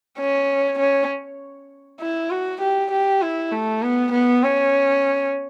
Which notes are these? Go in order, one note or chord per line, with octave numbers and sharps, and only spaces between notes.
C#4
C#4
E4
F#4
G4
G4
E4
A3
B3
B3
C#4